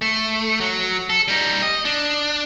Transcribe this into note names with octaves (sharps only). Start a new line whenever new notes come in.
A3
F#3
A4
G3 D#4
D#5
D4